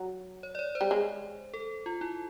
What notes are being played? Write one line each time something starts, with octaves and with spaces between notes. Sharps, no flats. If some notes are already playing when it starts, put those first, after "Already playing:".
Already playing: F#3
C#5
D5
C#5
C5
G3
G#3
A4
F4
E4